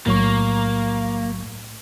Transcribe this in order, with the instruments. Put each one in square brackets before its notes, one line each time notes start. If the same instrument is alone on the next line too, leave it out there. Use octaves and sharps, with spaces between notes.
[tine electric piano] B1 F#3 C#6 [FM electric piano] A2 [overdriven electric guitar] A#3